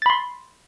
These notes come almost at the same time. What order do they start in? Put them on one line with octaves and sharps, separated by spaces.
A6 B5 C6